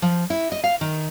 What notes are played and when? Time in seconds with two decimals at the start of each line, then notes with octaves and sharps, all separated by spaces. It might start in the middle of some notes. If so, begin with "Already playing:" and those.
0.02 F3
0.30 E4
0.52 D#5
0.64 F5
0.81 D#3